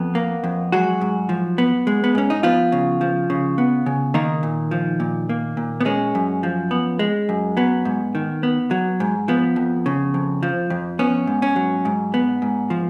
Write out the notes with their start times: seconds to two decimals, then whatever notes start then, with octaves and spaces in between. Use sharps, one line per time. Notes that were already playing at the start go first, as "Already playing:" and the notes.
Already playing: F2 B3
0.15 A#3
0.44 F2
0.72 F#3 G#3 F#4
1.01 G#2
1.29 F3
1.58 B3
1.87 G#3
2.04 B3
2.15 G#2 C#4
2.30 D#4
2.43 F3 B3 F4
2.72 C#3
3.01 F3
3.30 C#3
3.58 B3
3.86 C#3
4.14 D#3 A#3 D#4
4.43 A#2
4.71 F3
5.00 A#2
5.29 A#3
5.57 A#2
5.81 B3
5.85 G#3 C#4
6.15 F#2
6.43 F3
6.71 B3
6.99 G#3
7.29 F#2
7.57 F#3 B3
7.85 G#2
8.15 D#3
8.43 B3
8.71 F#3
9.00 G#2
9.28 F3 B3
9.56 F2
9.86 C#3
10.14 F2
10.43 F3
10.70 F2
10.99 B3 C#4
11.27 G#2
11.42 C#4
11.56 F#3
11.85 G#2
12.14 B3
12.42 G#2
12.70 F3